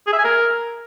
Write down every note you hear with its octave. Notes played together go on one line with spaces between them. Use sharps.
G#4
E5
G#5
A#4